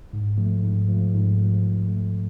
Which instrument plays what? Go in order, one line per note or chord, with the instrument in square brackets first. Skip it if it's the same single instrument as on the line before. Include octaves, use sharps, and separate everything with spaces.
[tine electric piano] G#2
F3 A3
G#2
F3 A3
G#2
F3 A3
G#2
F3 A3